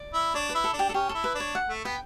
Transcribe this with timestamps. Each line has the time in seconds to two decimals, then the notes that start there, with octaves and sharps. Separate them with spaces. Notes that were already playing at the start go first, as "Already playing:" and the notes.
Already playing: D5
0.14 E4
0.34 D4 C#5
0.49 B4
0.55 E4
0.64 A4
0.74 D4
0.79 G4
0.89 A4
0.94 C#4 G4
1.09 E4 A4
1.24 B4
1.35 D4
1.40 C#5
1.55 F#5
1.69 A3
1.84 B3 G5